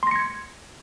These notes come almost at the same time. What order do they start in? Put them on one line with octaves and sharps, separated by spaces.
C6 A#6 C#7 G#6